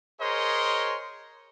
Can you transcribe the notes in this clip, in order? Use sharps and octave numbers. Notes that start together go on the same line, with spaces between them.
G#4 A#4 C5 C#5 D#5 C6